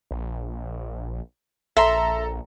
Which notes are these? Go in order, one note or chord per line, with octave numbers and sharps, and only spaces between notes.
A#1
A#1 A4 E5 A#5 C6